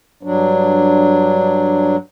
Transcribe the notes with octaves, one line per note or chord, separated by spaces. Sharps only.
G2 F#3 D4